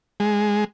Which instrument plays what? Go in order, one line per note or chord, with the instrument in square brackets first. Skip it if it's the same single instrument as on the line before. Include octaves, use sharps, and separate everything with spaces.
[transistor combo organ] G#3